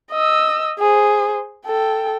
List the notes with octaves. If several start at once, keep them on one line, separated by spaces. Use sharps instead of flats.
D#5 E6
G#4 C5
A4 G5